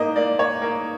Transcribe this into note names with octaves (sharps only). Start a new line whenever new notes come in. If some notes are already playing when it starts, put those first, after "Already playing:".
Already playing: G#2 A#3 D#5
A#3 D5
A#3 C#5
A#3